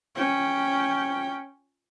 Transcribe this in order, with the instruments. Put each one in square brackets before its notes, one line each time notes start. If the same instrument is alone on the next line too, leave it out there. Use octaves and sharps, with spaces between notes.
[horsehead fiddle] C#4 G5